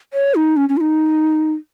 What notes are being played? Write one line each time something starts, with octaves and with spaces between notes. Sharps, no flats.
C#5
D#4
C#4
C#4
F4
D#4